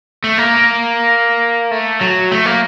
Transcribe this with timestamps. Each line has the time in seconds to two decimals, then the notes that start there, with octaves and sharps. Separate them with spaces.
0.24 A3
0.38 A#3
1.71 A3
2.01 F#3
2.32 A3
2.46 A#3